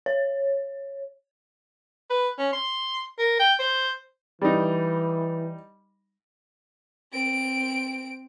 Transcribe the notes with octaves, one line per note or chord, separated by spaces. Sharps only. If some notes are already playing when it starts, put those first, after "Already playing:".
C#5
B4
C#4
C6
A#4
G5
C5
E3 G3 D#4
C4 D7